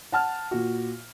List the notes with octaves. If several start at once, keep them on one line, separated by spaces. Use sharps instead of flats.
F#5 A5 F6
A#2 F#4